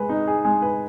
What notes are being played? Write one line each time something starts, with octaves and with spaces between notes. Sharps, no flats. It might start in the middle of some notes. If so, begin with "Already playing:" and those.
Already playing: G#3 B4
D#4
G#4
G#3
B4